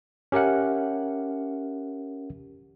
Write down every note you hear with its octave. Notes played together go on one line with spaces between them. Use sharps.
C#4 G4 A#4 E5 F#5